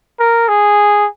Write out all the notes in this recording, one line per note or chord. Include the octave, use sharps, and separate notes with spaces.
A#4
G#4